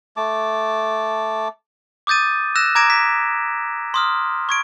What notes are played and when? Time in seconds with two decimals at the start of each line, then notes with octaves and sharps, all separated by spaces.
0.17 A3 A5 D6
2.07 D6 D#6 G6 A6 D#7
2.55 E6 F#6 A#6 E7
2.75 A#5 D6 G#6 A#6 D7 E7
2.90 B6
3.94 C6 D#6 F6
4.49 C#6 G#6 D7